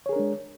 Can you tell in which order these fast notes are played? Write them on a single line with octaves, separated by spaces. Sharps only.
C#5 G#4 A#4 D4 G#3